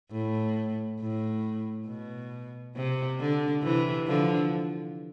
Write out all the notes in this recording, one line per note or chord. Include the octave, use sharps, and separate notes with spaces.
A2
A2
B2
C3
D3
C3 E3
D3 F3